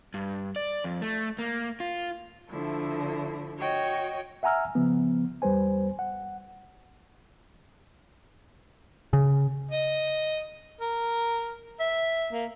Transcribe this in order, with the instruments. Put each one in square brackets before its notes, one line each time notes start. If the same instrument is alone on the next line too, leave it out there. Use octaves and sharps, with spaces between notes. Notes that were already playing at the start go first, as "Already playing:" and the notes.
[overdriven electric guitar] G2
D5
F2
A3
A#3
F4
[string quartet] D3 F3 A3 E4
F#4 C#5 D#5 G5
[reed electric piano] E5 F#5 G#5 A#5 E6 F6
C#3 F3 B3
E2 G3 B4 C5 G#5
F#5
[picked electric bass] C#3
[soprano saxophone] D#5
A#4
E5
A#3